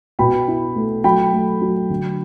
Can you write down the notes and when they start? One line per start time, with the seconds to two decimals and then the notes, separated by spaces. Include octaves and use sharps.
0.19 B2 G5 B5
0.48 E4
0.76 A3
1.04 F#3 G5 B5
1.33 A3
1.62 F#3
1.90 D3